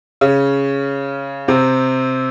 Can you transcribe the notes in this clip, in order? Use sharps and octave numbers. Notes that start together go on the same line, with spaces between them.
C#3 C#4
C3 C4